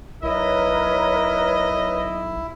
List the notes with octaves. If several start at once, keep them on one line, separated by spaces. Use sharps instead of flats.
B1 E4 A#4 B4 C#5 D#5